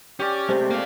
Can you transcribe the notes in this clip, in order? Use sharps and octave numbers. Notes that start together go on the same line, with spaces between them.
C#4 G4 D5
C3 G#3 A3 C4
A#3 F4